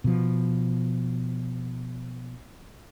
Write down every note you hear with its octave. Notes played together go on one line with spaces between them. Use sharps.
B2 F3